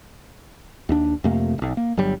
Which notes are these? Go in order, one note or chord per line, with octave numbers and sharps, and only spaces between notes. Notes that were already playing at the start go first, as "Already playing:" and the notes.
D#2 D4
F2 C3 A3 A#3
D#1 B1
A#3
G1 F#3 G3